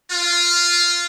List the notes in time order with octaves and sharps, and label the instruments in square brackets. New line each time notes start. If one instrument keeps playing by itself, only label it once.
[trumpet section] F4